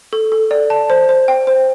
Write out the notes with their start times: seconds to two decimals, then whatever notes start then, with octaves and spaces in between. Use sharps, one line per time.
0.13 A4
0.32 A4
0.51 D5
0.70 A5
0.90 C5
1.09 C5
1.28 G5
1.47 C5